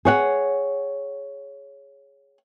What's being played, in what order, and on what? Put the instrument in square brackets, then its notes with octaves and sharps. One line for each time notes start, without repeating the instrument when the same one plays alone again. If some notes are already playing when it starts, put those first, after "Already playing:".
[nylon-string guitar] G#4 C#5 F#5